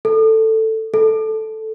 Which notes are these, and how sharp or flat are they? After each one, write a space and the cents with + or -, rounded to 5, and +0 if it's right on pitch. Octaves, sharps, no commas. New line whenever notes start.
A4 +10
A4 -5